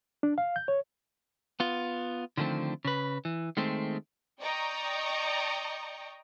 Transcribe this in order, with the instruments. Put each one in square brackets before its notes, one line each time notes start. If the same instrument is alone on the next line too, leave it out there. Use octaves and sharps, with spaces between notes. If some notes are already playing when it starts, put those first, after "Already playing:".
[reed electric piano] D4
F5
G6
C#5
[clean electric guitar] B3 F4
D3 D#3 F3 A3 C4
C#3 B4
E3
D#3 G#3 A3 C4
[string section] D5 D#5 G5 A#5 C#6 D#6